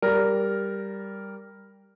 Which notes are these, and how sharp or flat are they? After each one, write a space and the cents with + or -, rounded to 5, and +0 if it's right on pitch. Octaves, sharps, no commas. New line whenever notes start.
G3 +5 A#4 -5 D5 -20